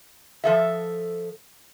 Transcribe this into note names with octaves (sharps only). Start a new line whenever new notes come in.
F3 A4 E5